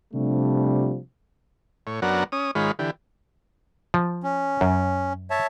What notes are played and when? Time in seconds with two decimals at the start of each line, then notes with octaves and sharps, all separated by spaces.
0.14 C3 F3 G3 A3 D4
1.87 A2 C#5
2.02 F#2 F#3 B3 D4 A#4 F#5
2.32 C#4 D#6
2.55 G#2 D#3 G#3 F4 C#5 B5
2.79 D3 E3 G4
3.94 F3
4.23 C#4
4.61 F#2
5.31 C#5 E5 A5